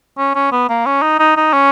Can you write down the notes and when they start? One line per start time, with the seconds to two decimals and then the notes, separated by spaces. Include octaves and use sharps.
0.18 C#4
0.35 C#4
0.52 B3
0.69 A#3
0.86 C#4
1.02 D#4
1.19 D#4
1.37 D#4
1.53 C#4